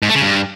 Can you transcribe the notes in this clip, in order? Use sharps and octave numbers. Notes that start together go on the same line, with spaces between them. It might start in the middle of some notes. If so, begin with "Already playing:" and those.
G#2
A3
C#3
G2